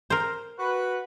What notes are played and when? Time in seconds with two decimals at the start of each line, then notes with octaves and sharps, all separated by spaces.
0.10 A#4 C5
0.58 F#4 B4